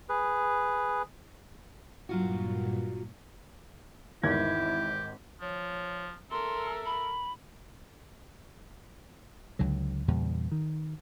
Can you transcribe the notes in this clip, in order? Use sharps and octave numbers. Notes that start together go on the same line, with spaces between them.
G#4 B4
G2 A#2 F#3 F4 F#4
G#1 E2 D#3 E4 G4 G#6
F3 C#5
A4 A#4 E5 C6
B5
C#2 D3 F#3
E2 A#2 C#3 G3
D#3